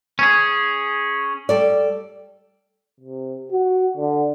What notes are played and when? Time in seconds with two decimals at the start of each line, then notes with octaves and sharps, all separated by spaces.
0.19 C#4 G#4
1.49 G3 A4 D5
3.00 C3
3.52 F#4
3.97 D3